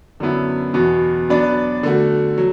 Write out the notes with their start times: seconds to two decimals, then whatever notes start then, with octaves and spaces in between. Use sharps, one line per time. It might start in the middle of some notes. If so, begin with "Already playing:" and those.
0.20 F#2 D3 F#3 B3 E4
0.74 E2 B2 B3 F#4
1.29 F#3 B3 D4 B4 D5
1.83 D3 A3 F#4
2.38 F#3